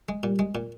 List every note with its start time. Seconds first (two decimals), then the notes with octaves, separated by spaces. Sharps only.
0.09 G#3
0.23 A#2 G3
0.39 G#3
0.55 A#2